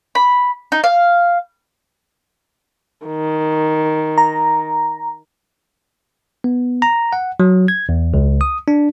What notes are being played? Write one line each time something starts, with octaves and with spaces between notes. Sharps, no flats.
B5
D#4
F5
D#3
A#5
B3
A#5
F#5
F#3
G#6
E2
C#2
D#6
D4